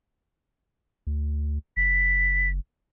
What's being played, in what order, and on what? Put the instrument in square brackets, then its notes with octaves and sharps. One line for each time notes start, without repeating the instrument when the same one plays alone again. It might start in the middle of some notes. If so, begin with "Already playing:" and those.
[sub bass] D2
[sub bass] F#1 [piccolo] B6